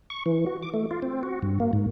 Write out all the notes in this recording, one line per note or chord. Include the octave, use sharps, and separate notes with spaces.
C#6
E3
F#4
D6
A3
F4
C4
F#4
G2
A#3
G#2